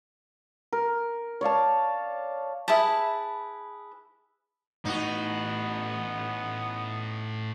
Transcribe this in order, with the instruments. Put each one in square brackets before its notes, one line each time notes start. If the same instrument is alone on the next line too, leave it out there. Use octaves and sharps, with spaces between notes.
[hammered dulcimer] A#4
C#5 D5 F5 A5
[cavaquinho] E4 G#4 B4 A5
[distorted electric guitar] A2 B4 [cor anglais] B3 [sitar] D#4 F#4